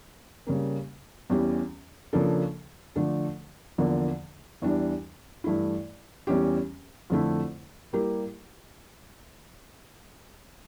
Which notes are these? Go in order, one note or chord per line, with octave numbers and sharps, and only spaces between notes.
C#3 G3 A#3
E2 E3 G3 C#4 G4
C#3 F3 A#3 D4 A4
D3 F3 A3 D4 A4
E2 D3 F3 A#3
E2 E3 G3 D4
G2 E3 A3 E4
E2 E3 G3 C#4 G4
F2 D3 A3 E4
G3 A#3 E4 G4 A#4